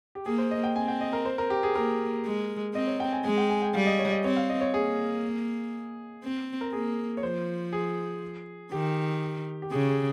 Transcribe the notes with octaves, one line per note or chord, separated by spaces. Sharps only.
G4
A#3 G#4
C5
D#5
G5
C4 G#5
G5
D#5
A#4
C5
A#4
G4
G#4
A#3 A#4
G#3
C4 D#5
C#5
G5
G#5
G#3 G#5
G5
G#5
G5
G3 F5
D#5
C#5
D#5
C4 C#5
F5
D#5
C#5
A#3 G#4
C4
A#4
A#3 G#4
C#5
F3 C5
G#4
D#3 G4
G4
C#3 G#4
G#4